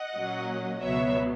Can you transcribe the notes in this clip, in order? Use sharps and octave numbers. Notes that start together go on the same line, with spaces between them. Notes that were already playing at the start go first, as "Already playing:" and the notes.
Already playing: D#5 F#5
A#2 F#3 A#3 C#4
C#2 B2 F#3 B3 C#5 E5